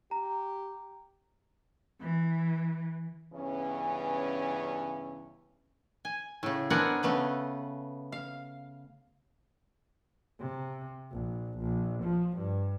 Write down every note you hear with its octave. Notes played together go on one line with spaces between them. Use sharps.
G4 A#5
E3
G2 C#3 E3 B3 C#4
G#5
A2 C#3
B3 C4 D4 A#4 F#5 G#5
C#3 A3 B3 B4
F5
C3
A#1
A#1
F3
G2